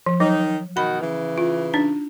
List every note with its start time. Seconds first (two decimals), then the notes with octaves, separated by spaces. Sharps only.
0.06 F3
0.20 D#3 F#3 D#4
0.77 B2 D#3 F#4 B5
1.01 C#3 E3
1.38 F4
1.74 D4 D#4